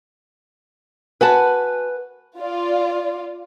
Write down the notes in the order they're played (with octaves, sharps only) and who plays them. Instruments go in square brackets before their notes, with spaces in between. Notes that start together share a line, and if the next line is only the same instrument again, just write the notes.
[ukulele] F#4 F#5 A5 [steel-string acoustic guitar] B4 G#5
[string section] F4 D5